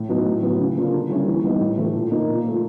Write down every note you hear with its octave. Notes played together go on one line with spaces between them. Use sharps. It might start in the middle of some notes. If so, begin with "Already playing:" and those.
Already playing: A2
F#3 B3 D#4
A2
F#3 B3
C#3
F3 A#3 D4 F4
D3
G3 A#3 C#4 E4
E3
G3 B3 D#4
A2
E3 A3
A#2
F3 A#3 D#4
A#2
F3 A3